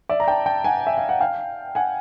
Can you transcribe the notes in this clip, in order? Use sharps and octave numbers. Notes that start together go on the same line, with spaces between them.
D5 E5
A#5
G5 A5
G5 A5
F#5 G#5
E5
F5
F#5
F5 G5
F#5 G#5